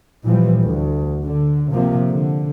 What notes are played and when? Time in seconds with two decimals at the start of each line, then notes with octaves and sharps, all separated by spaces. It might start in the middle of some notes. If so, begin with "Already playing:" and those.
0.25 A#2 E3 F3 G3
0.62 D2
1.25 D3
1.72 C3 F3 A#3
2.10 D3